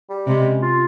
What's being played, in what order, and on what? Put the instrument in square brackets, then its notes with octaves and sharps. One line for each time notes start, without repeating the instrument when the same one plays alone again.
[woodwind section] G3
[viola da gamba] C3 [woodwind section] G#3
[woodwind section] C#4
F4